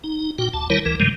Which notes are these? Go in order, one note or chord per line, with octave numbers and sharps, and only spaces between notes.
D#4
A#2 F#4 G5
D2 A5
D#3 G3 E4 A#4 C#5
D2 E3 A#4
G2 C3 D#3 F3 G3 G#3